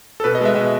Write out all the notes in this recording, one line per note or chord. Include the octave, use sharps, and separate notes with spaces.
A4
B2 B4
D#5
G#3 B3 E5
B2 E5